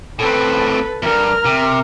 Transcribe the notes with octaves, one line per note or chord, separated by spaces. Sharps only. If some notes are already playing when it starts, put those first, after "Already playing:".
A2 C4 A4 B4
E2 G2 A#4 F6
C3